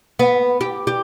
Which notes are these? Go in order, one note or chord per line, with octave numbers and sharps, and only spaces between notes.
B3
G4
G4